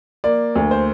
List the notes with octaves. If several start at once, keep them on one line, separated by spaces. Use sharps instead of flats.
A#3 D5
D2
C5